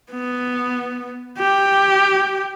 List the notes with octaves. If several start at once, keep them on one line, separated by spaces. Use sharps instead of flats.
B3
G4